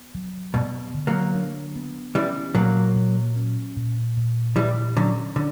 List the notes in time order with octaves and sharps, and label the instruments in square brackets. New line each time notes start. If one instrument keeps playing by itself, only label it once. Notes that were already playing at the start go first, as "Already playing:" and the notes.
Already playing: [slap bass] B3
F#3
[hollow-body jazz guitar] G2 B2 [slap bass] B3
[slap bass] D3
[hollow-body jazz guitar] F#3 A#3
[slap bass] D4
B3
[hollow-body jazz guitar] E3 G3 [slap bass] C#4
[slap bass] A#2 [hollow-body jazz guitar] F#3 A#3
[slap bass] A#2
C#4
A#2
A#2
[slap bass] A#2 [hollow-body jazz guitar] E3 G3
[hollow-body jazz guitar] D3 F#3 [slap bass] C#4
[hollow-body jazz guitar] D3